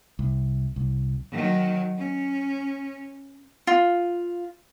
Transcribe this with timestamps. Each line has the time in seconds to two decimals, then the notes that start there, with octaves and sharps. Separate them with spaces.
0.19 C2
0.76 C2
1.32 D#3 F#3
1.97 C#4
3.67 F4